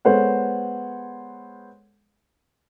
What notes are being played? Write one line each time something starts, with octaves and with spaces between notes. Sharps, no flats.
G#3 B3 A4 C5 C#5 F#5